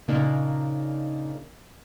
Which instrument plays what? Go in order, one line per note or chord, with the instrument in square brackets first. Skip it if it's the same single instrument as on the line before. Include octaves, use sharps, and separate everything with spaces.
[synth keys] A#2 C#3 A#3 D4 D#4